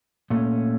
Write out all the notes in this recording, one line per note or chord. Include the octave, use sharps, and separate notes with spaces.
A#2 A3 C#4